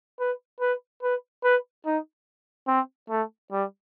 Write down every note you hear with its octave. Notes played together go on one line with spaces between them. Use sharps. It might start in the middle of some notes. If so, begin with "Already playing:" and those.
B4
B4
B4
B4
D#4
C4
A3
G3